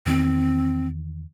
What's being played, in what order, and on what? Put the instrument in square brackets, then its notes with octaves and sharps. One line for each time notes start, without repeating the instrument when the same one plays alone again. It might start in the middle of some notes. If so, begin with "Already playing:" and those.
[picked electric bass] E2 D#3 [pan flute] C4